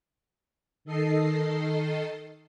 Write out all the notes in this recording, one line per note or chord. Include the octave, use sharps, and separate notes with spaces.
D#3 A4 D#5 C7